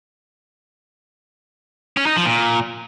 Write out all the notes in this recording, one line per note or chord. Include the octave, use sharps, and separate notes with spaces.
C#4
D#4
F3
A#2